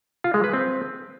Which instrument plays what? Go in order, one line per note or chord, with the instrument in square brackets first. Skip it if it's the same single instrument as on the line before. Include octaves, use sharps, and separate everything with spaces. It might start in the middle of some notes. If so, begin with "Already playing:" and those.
[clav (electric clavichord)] F4
G#3
B4
C4